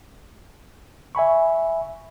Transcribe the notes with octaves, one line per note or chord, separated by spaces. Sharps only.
E5 G#5 B5 C#6